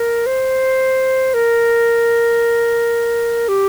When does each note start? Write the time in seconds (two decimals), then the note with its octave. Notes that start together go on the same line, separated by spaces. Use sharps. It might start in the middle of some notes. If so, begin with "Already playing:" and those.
Already playing: A#4
0.27 C5
1.34 A#4
3.49 G4